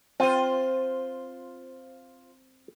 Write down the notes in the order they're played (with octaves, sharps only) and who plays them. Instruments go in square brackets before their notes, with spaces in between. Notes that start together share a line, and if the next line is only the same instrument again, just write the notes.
[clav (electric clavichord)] C4 [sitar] F4 C5